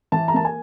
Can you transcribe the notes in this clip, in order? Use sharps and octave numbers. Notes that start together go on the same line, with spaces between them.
E3 A5
A#5
A#3 A5
G#5